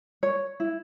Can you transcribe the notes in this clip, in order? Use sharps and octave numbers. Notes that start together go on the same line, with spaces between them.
C#5
E4